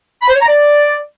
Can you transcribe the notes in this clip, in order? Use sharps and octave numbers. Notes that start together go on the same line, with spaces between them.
B5
C5
C#5
A#5
D5